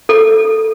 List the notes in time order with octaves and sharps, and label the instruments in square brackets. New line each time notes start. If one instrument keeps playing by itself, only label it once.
[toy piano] A4